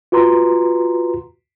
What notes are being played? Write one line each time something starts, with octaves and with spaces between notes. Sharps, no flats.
F4 F#4 B4 A#5 C6